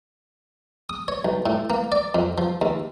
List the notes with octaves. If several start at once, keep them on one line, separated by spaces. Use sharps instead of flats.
D#6
C#5
B1
A2
A#3
D5
F2
F3
D#2